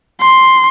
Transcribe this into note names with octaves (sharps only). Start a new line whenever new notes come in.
C6